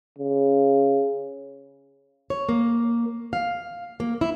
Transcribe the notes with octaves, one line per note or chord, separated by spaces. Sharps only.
C#3
C#5
A#3
F5
A#3
E4